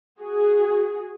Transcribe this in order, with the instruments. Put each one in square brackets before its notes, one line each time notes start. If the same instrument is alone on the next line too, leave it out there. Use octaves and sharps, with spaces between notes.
[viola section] F#4 G#4